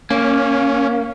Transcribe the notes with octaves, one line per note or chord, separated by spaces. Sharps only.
A#3 C#4